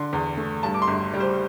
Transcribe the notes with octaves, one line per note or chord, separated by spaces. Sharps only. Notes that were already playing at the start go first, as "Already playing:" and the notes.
Already playing: D3 C6
E2
A3
G2 A5
D6
C6
G1
G3
C5